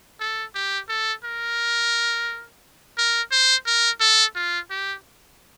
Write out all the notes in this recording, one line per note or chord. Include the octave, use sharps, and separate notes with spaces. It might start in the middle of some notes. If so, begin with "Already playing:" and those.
A4
G4
A4
A#4
A#4
C5
A#4
A4
F4
G4